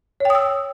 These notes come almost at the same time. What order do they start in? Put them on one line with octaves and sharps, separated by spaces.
C#5 G5 D#6 E6